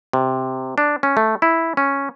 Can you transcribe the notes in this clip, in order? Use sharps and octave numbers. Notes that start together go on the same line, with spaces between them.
C3
D4
C#4
A3
E4
C#4